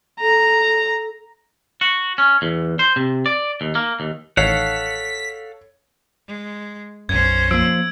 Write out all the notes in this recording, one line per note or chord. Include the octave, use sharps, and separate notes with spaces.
A4 A#5
F#4
C#4
E2
C5
C3
D5
D#2
A#3
D#2
A1 D#3 A4 C#5 F5 F#5 B6
G#3
B1 F#2 C#4 C5 G#6
F3 A#3 E6 D7